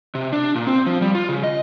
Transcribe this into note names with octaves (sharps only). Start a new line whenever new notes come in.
C3
D4
A#2
C4
F3
G3
F4
C#3
D#5